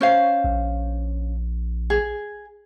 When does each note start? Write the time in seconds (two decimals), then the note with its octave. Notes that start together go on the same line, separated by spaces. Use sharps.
0.01 C#4 C5 F5
0.44 A#1
1.90 G#4